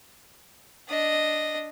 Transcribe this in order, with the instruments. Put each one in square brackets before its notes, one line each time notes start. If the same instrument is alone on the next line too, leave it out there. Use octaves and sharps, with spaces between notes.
[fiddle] D4 D#5